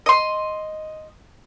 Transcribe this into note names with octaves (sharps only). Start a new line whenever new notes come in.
D#5 C6